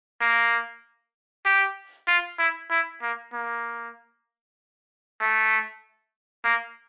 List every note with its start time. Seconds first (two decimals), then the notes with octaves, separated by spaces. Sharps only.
0.21 A#3
1.46 G4
2.08 F4
2.39 E4
2.71 E4
3.02 A#3
3.34 A#3
5.21 A3
6.45 A#3